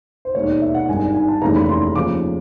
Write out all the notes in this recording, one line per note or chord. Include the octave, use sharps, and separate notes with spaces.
C5
E1 D#2 D#3 C#5
D5
E5
F#5
G#1 G2 D#3 G#5
G#5
G#5
A5
F1 D#2 C#3 E3 A#5
B5
C6
D#2 C#3 F3 D6